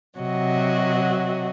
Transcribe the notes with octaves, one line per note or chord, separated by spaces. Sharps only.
C3 F#3 F#4 D#5